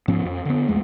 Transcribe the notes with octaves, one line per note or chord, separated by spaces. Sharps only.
G#2 F3 B3 C#4
F2
D3 B3
A#1 E2 G#3 A3